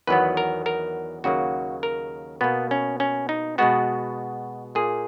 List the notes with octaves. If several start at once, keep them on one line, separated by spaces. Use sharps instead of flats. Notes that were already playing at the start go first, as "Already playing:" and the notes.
E2 D#3 F#3 B3 B4
A#4
A#4
D#2 C#3 F#3 A#3 F#4
A#4
B2 A#3 B3
C#4
C#4
D#4
B2 G#3 B3 F#4
A#2 A#3 G#4